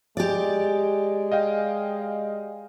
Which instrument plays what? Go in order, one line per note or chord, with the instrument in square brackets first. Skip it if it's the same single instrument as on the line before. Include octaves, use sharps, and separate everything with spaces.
[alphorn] G#3 [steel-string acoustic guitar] G4 D5
[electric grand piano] D#5 F5 G5